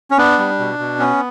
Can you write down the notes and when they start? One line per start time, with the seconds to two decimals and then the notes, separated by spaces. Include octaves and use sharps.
0.11 C#4
0.18 B3 D4
0.39 G3
0.59 B2
0.79 B2
0.99 B3 C#4